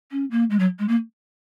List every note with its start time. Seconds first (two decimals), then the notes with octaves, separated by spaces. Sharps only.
0.11 C#4
0.31 A#3
0.50 G#3
0.59 F#3
0.79 G#3
0.88 A#3